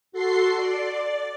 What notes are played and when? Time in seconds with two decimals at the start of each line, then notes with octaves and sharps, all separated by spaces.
0.12 F#4 A4 C6 C7
0.56 D5